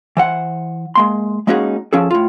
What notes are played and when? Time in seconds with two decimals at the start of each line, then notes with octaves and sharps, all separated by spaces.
0.17 E3 C5 F#5
0.95 G#3 A#3 C6
1.47 G#3 A#3 C#4 D#4 F#4 G#4
1.93 F3 C#4 G#4 A4
2.11 A2 F4